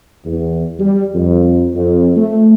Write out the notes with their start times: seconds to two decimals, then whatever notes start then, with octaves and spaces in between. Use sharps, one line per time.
0.25 E2
0.79 G3
1.14 F2
1.75 F2
2.17 A3